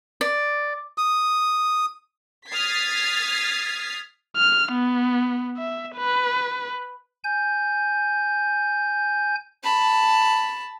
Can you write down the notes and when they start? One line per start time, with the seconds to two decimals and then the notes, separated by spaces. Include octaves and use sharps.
0.21 D5
0.98 D#6
2.49 D#6 F6 G#6 A6 B6 C7
4.37 F6
4.73 B3
5.58 E5
5.96 B4
7.24 G#5 G6
9.64 A5 B5